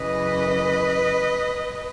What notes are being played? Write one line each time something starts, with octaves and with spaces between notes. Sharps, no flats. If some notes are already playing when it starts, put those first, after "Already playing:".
Already playing: F#2 C#3 E3 B4 D#5